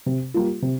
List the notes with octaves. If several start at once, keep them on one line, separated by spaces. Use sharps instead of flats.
C3
G3 A#3 F4
C3